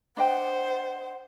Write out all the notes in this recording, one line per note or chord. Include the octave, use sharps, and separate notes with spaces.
D4 C5 D#5 F#5 G5